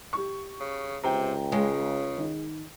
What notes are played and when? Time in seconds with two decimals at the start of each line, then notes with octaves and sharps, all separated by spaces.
0.13 G4 C#6
0.60 C#3
1.03 C#2 C3 G5 A#5
1.52 C#3 G#3
2.18 D#3